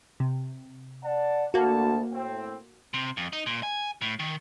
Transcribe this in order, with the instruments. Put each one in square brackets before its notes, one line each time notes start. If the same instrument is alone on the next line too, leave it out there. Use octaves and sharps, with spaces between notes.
[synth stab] C3
[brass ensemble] D5 F#5 A5
[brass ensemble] D2 A5 [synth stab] A#3 F#4
[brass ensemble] A2 C4
[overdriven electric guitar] C3
F2
D#4
A#2
G#5
A2
D#3